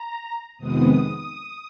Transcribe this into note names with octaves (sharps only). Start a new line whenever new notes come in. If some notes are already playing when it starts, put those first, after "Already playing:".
Already playing: A#5
F2 C3 D#3 G#3 B3 D#6